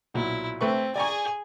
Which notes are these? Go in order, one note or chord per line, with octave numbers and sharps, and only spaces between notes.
B1 A#2 F#3 E4
A3 C4 B4 C#6
G#4 D5 G#5 A#5 C#6